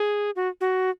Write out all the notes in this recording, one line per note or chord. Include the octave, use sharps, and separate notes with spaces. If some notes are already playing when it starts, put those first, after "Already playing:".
Already playing: G#4
F#4
F#4